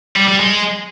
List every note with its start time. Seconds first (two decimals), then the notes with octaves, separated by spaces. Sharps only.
0.16 G3
0.27 G3
0.39 G#3